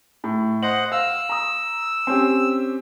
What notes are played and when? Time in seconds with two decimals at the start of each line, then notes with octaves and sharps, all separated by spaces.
0.24 A2
0.63 C5 D#5 F#5 F#7
0.92 F5 E6
1.29 A#5 D#6
2.07 C4 C#4 G4